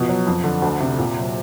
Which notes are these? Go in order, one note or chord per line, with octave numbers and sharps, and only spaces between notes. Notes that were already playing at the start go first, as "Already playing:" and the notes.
Already playing: B2 F3
F#3
F2
D3
D2
C3
A#2
F#3